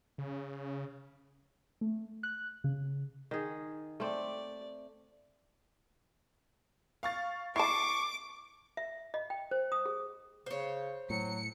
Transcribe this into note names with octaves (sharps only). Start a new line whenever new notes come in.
C#3
A3
F#6
C#3
D#3 G#4
A3 C4 D5
F5 C#6 A6
E4 A5 C#6 D6 C7
E5
D#5
G5
C5
D#6
G#4
C#3 C5 C#5
A2 F#3 C#7